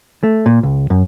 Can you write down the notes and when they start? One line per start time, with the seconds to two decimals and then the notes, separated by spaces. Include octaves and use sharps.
0.23 A3
0.46 A#2
0.63 C#2
0.90 F#2